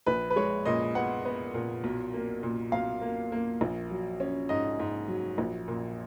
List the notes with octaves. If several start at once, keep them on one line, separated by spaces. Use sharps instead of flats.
A#1 B4
B4
G#3 C#5
A#2 D#5
B3 F#5
B3
A#2
B1
A#3
A#2
B1 F5
A#3
A#3
A#1
F#3
C#4
G#2 D#5
G#2
F#3
A#1
A#2